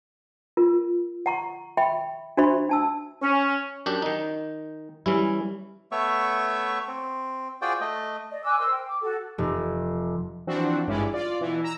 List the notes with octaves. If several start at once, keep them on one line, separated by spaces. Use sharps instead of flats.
F4 A#4
F#5 A#5 C#6
E5 G5 B5 C#6
D4 F#4 C5 E5 B5 C#6
D4 A5 E6
C#4
F#2 D4 G4
D#3 D#4
E3 G3 C#4 E4
A3 B3 C#5 E5 C#6
C4
F4 F#4 G#4 C5 D5 G5
A3 D#5
D5 D#5
G#5 D6 E6 F#6
A#4 C5 C6 E6
G5
D6
F#4 A4
F1
E3 F3 C4 D4 F#4
G#1 G2 G#3 C#4 E4 D5
F4 D5
B2 E3 E4
A#5 E6